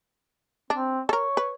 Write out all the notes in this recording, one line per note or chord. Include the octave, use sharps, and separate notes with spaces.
C4 D4
A4 A#4 C#5
B4